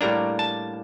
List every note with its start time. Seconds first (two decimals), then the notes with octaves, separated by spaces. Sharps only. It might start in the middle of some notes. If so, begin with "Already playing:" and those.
0.01 A2 G3 A#3 D4 A#5
0.39 A5